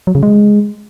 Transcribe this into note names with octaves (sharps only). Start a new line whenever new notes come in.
F#3
C#3
G#3